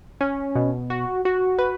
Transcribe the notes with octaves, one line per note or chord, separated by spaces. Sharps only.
C#4
B2
F#4
F#4
B4